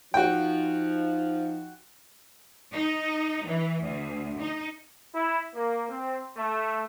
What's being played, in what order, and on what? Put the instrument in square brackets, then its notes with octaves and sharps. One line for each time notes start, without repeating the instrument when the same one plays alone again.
[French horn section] F3 D#4 [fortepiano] F#4 G5
[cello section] D#4
E3
D2
D#4
[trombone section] E4
A#3
C4
A3